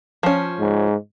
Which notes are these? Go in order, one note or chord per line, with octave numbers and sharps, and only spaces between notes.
F3 C#4
G#2